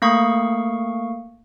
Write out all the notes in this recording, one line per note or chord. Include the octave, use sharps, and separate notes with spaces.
A3 A#3 F5 C#6